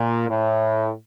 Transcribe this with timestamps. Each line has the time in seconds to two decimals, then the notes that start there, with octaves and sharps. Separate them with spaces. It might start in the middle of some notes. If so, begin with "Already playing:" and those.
Already playing: A#2
0.29 A2